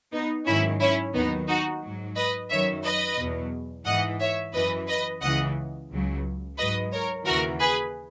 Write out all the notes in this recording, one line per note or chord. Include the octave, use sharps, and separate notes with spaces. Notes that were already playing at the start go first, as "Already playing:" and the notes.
B3 D#4
G#2 D#3 F#3 C#4 E4
C#4 E4
D#2 D#3 F#3 B3 D#4
D#4 F#4
G#2 F#3
B4 D#5
F#2 D#3 F#3 C#5 E5
B4 D#5
E2 B2 F#3
G#2 E3 D#5 F#5
C#5 E5
F#2 E3 B4 D#5
B4 D#5
C#2 C#3 E3 D#5 F#5
C#2 C#3 F#3
G#2 F#3 B4 D#5
A#4 C#5
D#2 C#3 E3 F#4 A#4
G#4 B4